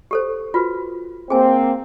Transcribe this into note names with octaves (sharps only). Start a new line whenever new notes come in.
G4 A4 C5
F4 F#4 B4
A#3 C4 G#4 G#5